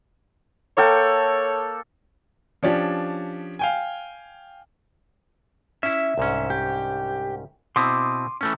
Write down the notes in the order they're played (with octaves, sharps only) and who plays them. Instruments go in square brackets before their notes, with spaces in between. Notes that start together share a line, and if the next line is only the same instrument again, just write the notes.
[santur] A#3 A4 G5 [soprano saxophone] C#5
[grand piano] F3 C#4 D4 G4 C#5
F5 G5 G#5
[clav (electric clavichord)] C#4 E4 [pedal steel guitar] E5
[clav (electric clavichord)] C2 G#2 C#4
[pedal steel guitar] G4
[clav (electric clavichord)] B2 C4 E4 [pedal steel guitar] C6 D6 D#6
[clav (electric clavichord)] E3 A3 C#4